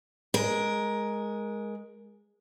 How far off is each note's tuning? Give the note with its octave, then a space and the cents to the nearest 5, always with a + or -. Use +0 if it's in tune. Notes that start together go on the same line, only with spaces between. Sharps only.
G#3 +5 A#4 +10